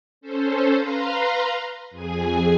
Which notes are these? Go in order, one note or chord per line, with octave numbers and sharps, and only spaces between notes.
C#4 A4 C5
B4 F5 A#5 C6
F2 G#4 G#5